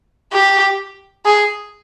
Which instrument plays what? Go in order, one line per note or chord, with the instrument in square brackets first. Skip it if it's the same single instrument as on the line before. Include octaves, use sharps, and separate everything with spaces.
[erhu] G4
G#4